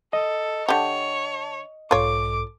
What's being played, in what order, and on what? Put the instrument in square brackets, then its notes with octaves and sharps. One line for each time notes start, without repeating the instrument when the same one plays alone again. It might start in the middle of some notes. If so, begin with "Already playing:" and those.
[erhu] A4 [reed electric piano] D#5
[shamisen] D3 G4 [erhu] C#5 [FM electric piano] A5
[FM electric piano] B1 G#2 A4 [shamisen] F4 C#5 [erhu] D6